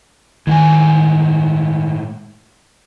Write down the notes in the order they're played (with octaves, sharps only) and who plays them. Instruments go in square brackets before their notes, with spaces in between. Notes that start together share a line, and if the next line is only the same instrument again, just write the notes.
[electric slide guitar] A2 G#3 G#5 [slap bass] D#3